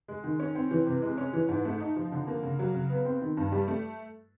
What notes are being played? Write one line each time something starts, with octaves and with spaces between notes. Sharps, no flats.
G#3
D#3
C#4
C4
E3
C3
G#3
C#4
E3
G#2
A3
D#4
F3
D3
A#3
C#3
F#3
C#3
B3
C4
D#3
G2
G3
A3